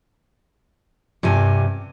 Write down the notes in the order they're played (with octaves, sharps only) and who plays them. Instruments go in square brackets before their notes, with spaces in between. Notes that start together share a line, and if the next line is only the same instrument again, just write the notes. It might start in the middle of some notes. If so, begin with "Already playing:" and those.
[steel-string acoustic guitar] G2 C3 G4 G#5